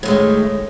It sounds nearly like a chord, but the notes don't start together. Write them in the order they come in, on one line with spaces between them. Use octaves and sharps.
A2 A3 G#3 D#3